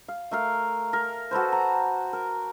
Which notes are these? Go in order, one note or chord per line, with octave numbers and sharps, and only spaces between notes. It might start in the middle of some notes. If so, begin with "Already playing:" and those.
F5
A3 A#4 F5
A#4
F#4 A4 B4 C5
A#5
A#4